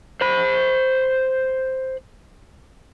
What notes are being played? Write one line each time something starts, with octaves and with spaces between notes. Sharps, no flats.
C5 B5